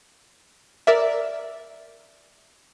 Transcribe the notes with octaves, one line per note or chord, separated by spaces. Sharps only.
A#4 D5 E5